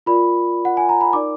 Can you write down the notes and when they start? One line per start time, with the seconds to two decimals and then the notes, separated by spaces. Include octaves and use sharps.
0.06 F4 A#4 D5 B5
0.65 F#5
0.77 G#5
0.89 A#5
1.01 B5
1.13 D#4 A#4 D5 D6